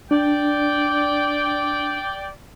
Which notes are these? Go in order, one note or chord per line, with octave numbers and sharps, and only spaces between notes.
D4 D5 G5